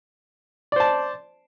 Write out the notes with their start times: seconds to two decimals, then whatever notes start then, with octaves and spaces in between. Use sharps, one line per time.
0.72 D5
0.76 C5
0.80 A5